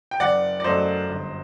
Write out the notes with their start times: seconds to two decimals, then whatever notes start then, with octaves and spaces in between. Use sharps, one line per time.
0.11 G5
0.20 F#1 D5 F#5
0.60 D5
0.64 F#2 F#3 A3 C5 D#5
1.08 G1